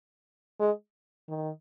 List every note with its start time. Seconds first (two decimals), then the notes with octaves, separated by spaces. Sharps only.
0.60 G#3
1.29 D#3